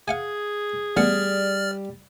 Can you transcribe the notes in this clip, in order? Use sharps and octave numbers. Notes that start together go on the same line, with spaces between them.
G#4 F5 F#5 G#5
A1 G3 B3 D5 F#5 F6